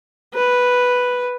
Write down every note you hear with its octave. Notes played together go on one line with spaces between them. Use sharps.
B4